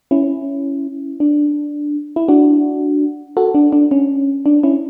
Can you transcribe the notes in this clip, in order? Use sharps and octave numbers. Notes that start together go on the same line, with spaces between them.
C#4 E4
D4
E4
D4 F#4
F#4 A4
D4
D4
C#4
D4
C#4 E4